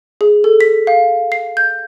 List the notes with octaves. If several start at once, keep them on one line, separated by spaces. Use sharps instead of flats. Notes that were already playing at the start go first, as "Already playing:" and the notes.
G#4
A4
B6
F5
C7
G6